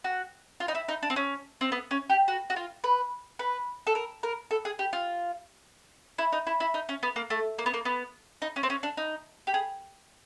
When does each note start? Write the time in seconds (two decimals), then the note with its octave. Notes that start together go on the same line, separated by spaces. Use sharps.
0.04 F#4
0.60 F4
0.68 D#4
0.75 E4
0.88 D#4
1.03 D4
1.10 C4
1.16 C#4
1.61 C4
1.72 B3
1.91 C#4
2.10 G4
2.28 F#4
2.50 F#4
2.56 F4
2.84 B4
3.39 B4
3.87 A4
3.95 A#4
4.23 A#4
4.51 A4
4.65 G#4
4.79 G4
4.93 F4
6.18 E4
6.33 D#4
6.47 E4
6.60 E4
6.74 D#4
6.89 C#4
7.03 B3
7.16 A#3
7.30 A3
7.58 A#3
7.66 B3
7.74 A#3
7.85 B3
8.42 D#4
8.56 C#4
8.63 C4
8.70 C#4
8.83 D4
8.97 D#4
9.47 G4
9.54 G#4